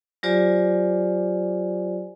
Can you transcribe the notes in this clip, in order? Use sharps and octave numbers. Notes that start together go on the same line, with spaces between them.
F#3 F4 G4 C5 D5 G#5